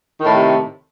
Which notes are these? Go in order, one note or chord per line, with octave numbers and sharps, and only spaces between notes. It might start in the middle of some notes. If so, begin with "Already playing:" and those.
A2 C3 D#3 A3